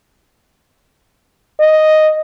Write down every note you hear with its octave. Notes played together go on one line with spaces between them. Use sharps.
D#5